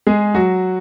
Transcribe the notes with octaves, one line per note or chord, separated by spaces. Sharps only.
G#3 G#4
F#3 F#4